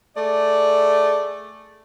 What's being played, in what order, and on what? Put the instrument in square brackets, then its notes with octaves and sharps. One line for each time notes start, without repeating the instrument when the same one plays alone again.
[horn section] A3 G#4 D5